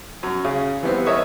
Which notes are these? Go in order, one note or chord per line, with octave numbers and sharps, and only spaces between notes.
F#2
C#3
E3 G3 B3 C4
A#4 C#5 D#5 E5 C#6 D#6